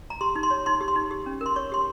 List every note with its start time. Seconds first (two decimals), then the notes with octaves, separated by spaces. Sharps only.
0.10 A#5
0.21 G4 C6
0.36 D#4
0.43 C6
0.51 C#5
0.66 D#4 C6
0.81 G4
0.88 C6
0.96 D#4
1.11 G4
1.26 C#4
1.41 A#4 C6
1.56 C#5 C#6
1.72 G4 C6